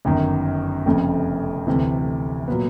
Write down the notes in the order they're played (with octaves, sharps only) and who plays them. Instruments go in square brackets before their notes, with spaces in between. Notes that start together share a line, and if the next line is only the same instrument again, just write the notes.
[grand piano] G1 F#2 D#3
F1 F2 C#3
D2 C3 E3
A#2 F#3 B3